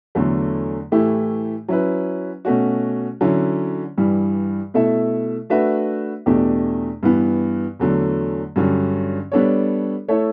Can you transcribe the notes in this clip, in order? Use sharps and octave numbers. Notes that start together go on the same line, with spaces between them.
E2 D3 F#3 A3
A2 E3 A3 E4 G4
F#3 C#4 E4 B4
B2 A3 C#4 F#4
D3 F#3 C#4 E4
G2 E3 G3
B2 A3 E4 A4 E5
A3 D4 F#4 B4 E5
E2 B2 A3 D4 G4
G2 E3 B3
E2 D3 F#3 A3
G2 D3 F#3 C#4
G3 B3 D4 A4 C#5
A3 E4 A4 C#5